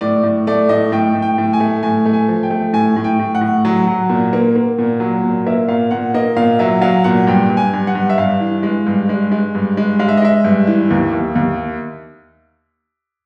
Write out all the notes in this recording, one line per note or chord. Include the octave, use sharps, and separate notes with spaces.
A2 D5
A2
A3 D5
A2 D#5
A2 G5
A2
G5
A2
G#5
A3
A2 G#5
A3
G#5
F3
G5
A3
A2 G#5
A2
G5
A2
F#5
A2
F#3
F#3
A#2
A#3
A#3
A#2
F#3
A#2
A#3 E5
A#2 F5
A#2 F#5
A#3 D#5
A#2 F5
F#3 E5
F#3 F5
A#2 F#5
G2 G5
G2
G#5
G2
F#5
G2
E5
G2 F5
E3
G#3
G2
G#3
G#3
G2
G#3
G#3 F5
E5
D#5
G#3 E5
G2
E3
D#2
D#2
D#2